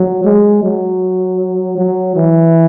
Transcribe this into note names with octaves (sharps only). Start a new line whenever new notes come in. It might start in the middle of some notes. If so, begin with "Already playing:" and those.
Already playing: F#3
G#3
F#3
F#3
E3